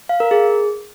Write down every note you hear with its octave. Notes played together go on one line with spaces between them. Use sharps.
F5
A#4
G#4